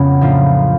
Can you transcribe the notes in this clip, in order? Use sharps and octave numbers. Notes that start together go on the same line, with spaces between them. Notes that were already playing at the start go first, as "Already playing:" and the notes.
Already playing: F2 C#3 F#3 B3
A2 F3 A#3 D4 F4